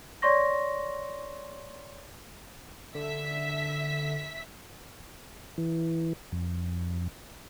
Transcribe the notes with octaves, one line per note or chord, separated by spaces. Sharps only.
C#5 D5 C6 C#6 A#6
D3 E5 B6
E3
F2